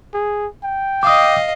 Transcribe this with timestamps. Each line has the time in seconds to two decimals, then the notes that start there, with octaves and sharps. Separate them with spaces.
0.14 G#4
0.63 G5
1.03 D#5 F5 D6 D#6